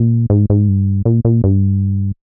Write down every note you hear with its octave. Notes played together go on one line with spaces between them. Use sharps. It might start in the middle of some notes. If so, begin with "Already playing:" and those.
Already playing: A#2
G#2
G#2
G2
A#2
A#2
G2